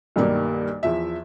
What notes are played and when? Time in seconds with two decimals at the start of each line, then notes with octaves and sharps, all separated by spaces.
0.16 B1 G2 D#3 G3 A#3
0.83 E2 F3 E5